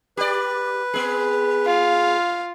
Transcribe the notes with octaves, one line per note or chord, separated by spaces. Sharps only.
G4 B4 D5
B3 G#4
F4 F5